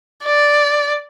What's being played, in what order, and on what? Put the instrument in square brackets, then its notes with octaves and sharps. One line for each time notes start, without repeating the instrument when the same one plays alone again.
[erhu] D5